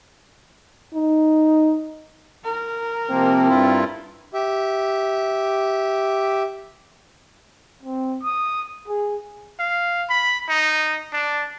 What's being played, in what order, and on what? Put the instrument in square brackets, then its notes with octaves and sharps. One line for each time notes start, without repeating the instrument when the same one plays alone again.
[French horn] D#4
[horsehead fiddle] A#4
[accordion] C3 F3 A#3 [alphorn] C4
[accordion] G2 E4 F4
[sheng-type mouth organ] G4 E5
[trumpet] C4
D#6
G#4
[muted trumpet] F5
B5
D#4
D4